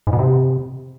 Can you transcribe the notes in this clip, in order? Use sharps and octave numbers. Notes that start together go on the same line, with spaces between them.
G#2
B2
C3